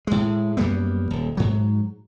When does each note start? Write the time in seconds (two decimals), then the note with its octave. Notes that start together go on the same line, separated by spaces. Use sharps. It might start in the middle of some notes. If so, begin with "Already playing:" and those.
0.07 A2 G#3
0.57 F#2 G3 A#3 B3
1.11 D#1
1.37 G#2 F#3